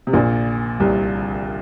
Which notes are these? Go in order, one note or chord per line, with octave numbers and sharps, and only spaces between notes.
C3
A#1 A#2
C2 C3